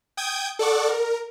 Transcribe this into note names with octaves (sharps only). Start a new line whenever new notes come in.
G5 D#6 G6 G#6
A4 D5 F#5 C#6 D6
A#4